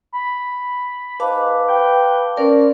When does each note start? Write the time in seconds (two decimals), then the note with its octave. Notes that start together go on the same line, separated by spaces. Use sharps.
0.13 B5
1.20 G#2 B4 F5 A5 D6
1.69 G5
2.37 C#4 F4 A#4 C5 D5 A5